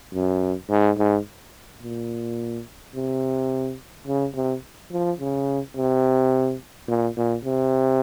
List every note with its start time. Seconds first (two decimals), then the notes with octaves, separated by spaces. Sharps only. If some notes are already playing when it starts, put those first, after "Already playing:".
0.14 F#2
0.70 G#2
0.98 G#2
1.83 A#2
2.95 C3
4.07 C#3
4.35 C3
4.92 F3
5.20 C#3
5.76 C3
6.88 A#2
7.17 A#2
7.44 C3